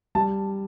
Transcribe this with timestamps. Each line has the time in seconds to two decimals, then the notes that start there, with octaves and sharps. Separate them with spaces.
0.15 G3 A5